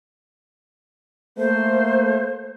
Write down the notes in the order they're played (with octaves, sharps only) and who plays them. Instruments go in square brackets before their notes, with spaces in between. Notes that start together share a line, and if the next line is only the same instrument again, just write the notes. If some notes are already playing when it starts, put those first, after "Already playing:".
[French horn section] A3 A#3 [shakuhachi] C5